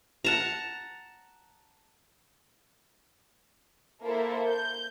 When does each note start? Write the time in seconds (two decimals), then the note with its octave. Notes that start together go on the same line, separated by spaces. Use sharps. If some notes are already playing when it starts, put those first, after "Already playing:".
0.24 F#5 A5 A#5
4.03 A#3 E4 A4 A#4 C5
4.47 G6